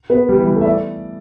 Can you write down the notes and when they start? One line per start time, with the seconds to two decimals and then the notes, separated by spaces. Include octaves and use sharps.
0.10 B3 B4
0.29 G3 G4
0.37 E3 E4
0.46 G3 G4
0.56 A3 A4
0.61 E5
0.65 D5